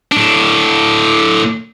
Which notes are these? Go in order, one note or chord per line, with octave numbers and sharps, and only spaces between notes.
A2 D4